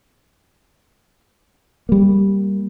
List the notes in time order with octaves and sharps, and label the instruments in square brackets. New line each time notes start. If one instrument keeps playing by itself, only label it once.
[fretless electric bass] G3 A#3